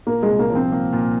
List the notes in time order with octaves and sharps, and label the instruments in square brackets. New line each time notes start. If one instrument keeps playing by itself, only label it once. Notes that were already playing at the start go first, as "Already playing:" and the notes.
[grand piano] A#2 [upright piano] A#3
[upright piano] G#3
[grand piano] C2
[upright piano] A#3
[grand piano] F3
[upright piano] C4
[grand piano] A#3
A#2